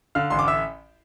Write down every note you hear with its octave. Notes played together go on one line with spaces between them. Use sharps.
D3 F5 F6
A1 C6
D6
E5 E6